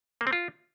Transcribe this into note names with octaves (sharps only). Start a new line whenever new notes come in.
A#3
C4
F4